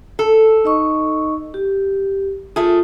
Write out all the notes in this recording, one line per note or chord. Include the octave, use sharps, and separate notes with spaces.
A4
D#4 D#5 C#6
G4
A3 F4 G#4 A5